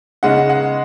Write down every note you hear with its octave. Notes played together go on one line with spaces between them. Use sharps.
C#3 G#3 D#4 F#5
F#5